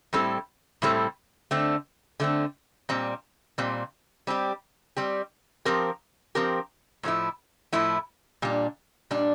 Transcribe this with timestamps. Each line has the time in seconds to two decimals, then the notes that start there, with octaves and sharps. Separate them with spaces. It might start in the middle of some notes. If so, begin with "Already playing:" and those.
0.13 A2 G3 C4 E4 A4
0.82 A2 G3 C4 E4 A4
1.51 D3 A3 C4
2.20 D3 A3 C4
2.89 A#2 G3 C4
3.58 A#2 G3 C4
4.27 G3 C4 G4
4.96 G3 C4 G4
5.65 F3 C4 G4 A#4
6.35 F3 C4 G4 A#4
7.03 A2 F3 A3 E4
7.73 A2 F3 A3 E4
8.42 A#2 G3 D4
9.11 A#2 G3 D4